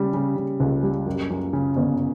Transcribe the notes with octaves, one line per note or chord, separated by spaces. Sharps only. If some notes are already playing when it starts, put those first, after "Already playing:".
Already playing: C#3 G3
C#3
C#3
C#2
G3
F#2
F#2
C#3
G1